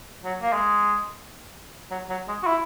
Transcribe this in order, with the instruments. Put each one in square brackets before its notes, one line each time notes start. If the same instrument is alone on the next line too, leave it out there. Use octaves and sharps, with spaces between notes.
[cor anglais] F#3
A#3
G#3
F#3
F#3
G#3
F#4
E4